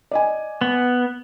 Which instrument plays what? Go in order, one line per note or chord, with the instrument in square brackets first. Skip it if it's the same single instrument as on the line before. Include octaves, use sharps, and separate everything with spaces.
[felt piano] D5 D#5 G#5
[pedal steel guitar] B3